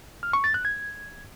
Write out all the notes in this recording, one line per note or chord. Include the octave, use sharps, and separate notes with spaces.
F6
C#6
A6
F#6
G#6